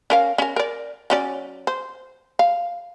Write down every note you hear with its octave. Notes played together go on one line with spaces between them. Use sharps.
C#4 A#4 F5
C#4 A#4
A#4 D5
F#3 C#4 D5
C5
F5